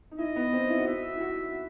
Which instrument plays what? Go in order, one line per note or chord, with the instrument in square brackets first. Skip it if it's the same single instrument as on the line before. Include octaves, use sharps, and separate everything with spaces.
[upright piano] D#4
[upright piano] E4 [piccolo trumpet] D#5
[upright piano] B3
C4
D#4
E4
F#4
[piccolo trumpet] E5
[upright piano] E4
F#4